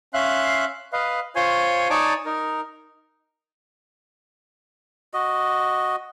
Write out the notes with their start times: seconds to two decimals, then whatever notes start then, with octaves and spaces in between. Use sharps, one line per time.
0.14 C#4 E5 F5 C6 F#6
0.93 B4 D#5 F5
1.36 F4 C5 C#5 G#5 C6
1.90 D#4 C#5 D5 G#5 A5 D6
2.26 D#4 A#4
5.14 F#4 D#5